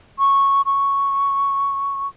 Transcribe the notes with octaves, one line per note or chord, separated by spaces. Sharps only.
C#6
C#6